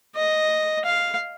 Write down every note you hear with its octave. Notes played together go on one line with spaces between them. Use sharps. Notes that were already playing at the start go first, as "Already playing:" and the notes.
D#5
F5